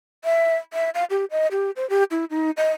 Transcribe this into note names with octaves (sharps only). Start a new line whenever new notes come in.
E5
E5
F5
G4
D#5
G4
C5
G4
E4
D#4
D#5